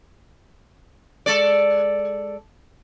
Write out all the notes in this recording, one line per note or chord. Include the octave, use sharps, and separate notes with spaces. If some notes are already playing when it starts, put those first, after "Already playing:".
G#3 A4 D5